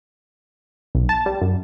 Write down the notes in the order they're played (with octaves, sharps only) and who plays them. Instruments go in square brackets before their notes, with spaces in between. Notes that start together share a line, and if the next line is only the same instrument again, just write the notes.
[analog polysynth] B1
A5
G3
F#2